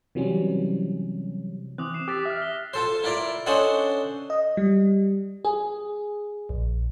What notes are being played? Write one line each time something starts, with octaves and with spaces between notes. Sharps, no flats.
C3 E3 F#3 G3 C4 C#4
E3 C4 D6 D#6 F#6
C7 E7
G4 D6 E6 A6 B6
E5 F6 A#6
G7
F4 A4 C5
E4 F4 A#4 D5 F5
C#4 D4 A4 C5 D#5 F#5
D#5
G3
G#4
A#1